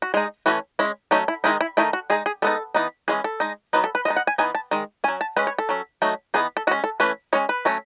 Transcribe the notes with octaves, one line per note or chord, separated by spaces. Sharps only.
F#4
G#3 D#4 G#4
E3 A3 C#4 F#4
G#3 C#4 E4
F#3 A3 C#4 D#4
E4
D#3 G#3 D#4 E4
E4
D#3 A3 D#4 E4
F#4
G#3 D#4 G#4
G#4
G#3 B3 D#4 A4
E3 B3 D#4
E3 G#3 C#4 G#4
A4
G#3 D#4
F#3 B3 D#4 B4
A4
B4
G#3 B3 D#4 D#5
F#5
G#5
E3 B3 D#4 G#5
A5
D#3 G#3
F#3 C#4 G#5
A5
G#3 C#4 B4
C#5
A4
F#3 C#4
F#3 A3 D#4
E3 B3 D#4 G#4
A4
G#3 C#4 F#4
A4
E3 A3 C#4 B4
G#3 C#4 C#5
B4
F#3 A3 C#4